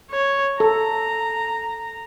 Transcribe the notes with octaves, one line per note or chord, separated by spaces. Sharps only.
C#5
A4 A#5